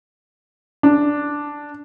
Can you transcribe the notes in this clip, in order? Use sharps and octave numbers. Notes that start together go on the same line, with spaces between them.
D4